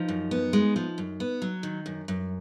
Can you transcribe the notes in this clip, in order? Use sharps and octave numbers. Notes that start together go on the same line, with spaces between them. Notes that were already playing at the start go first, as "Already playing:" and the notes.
Already playing: F3 D#4
F#2
B3
G#3
F3
F#2
B3
F#3
D#3
F#2
F#2